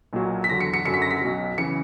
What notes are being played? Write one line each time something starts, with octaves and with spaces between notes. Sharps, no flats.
B1 A#2 F#3
B6
E2 D3 F#3 A#6
C#7
C#7
F#1 F#2 D3 F#3 C#7
B6
A#6
B6
B1 B2 F#3
C#3 E3 C#7